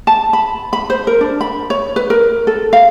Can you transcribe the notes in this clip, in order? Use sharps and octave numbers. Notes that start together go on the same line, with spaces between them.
A5
B5
B5
C5
A#4
D4
B5
C#5
B4
A#4
A4
F5